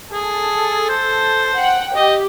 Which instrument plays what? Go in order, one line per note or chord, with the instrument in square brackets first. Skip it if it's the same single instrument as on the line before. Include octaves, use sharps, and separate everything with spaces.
[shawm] G#4 [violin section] A4
[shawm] C5
[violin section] F#5 G5
[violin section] G4 [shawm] D#5